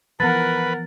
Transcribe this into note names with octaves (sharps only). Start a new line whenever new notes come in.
E3 F3 B3 A#4 B4 F#5 A6